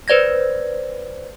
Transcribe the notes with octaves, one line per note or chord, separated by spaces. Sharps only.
B4 C5 D5 G#6 A#6